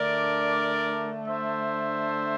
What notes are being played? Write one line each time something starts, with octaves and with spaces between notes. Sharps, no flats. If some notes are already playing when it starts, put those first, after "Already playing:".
Already playing: D3 A3 D4 A#4 D5
C5 E5